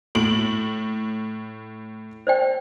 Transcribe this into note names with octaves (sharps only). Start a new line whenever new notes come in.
A2 F#4 D7 F#7
C5 D5 G5